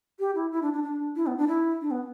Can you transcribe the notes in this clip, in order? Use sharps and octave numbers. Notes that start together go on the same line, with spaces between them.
G4
E4
E4
D4
D4
D4
E4
B3
D4
E4
D4
B3